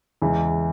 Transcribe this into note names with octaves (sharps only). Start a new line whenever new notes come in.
E2 C#3 E3 G#3